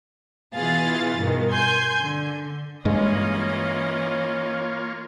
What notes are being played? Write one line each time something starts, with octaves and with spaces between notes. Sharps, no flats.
B2 E3 F4 G#4 F5 A6
G2 B2 D#3
G#5 C6 G6 G#6
D3
G2 E3 G#3 A#3 C#4 F4 C#5 D#5